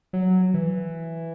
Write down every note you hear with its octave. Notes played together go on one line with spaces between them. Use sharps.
F#3
E3